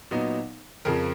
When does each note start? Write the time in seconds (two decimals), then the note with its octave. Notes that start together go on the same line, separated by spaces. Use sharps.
0.11 A#2 F#3 B3 D#4
0.85 F2 C#3 F3 A#4